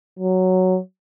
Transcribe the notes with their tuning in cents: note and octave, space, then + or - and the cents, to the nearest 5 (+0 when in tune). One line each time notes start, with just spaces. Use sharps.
F#3 +5